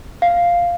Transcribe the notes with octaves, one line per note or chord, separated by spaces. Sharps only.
F5